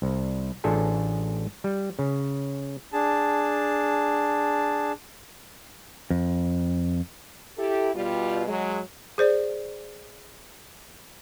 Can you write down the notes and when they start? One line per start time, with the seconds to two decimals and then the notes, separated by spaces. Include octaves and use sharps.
0.02 C2
0.64 A1 D4 F4 G#4 A4 G#5
1.64 G3
1.99 C#3
2.93 D4 G#4 A5
6.10 F2
7.58 E4 G4 A4
7.95 B2 G3 F4
8.48 F#3 G#3
9.18 G#4 C5 D5